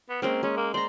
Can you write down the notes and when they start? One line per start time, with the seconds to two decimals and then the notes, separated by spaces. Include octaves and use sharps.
0.09 B3
0.22 G#3 A#3 C4 C#4
0.43 G#3 C#4
0.57 A#3
0.74 C5 D5 A#5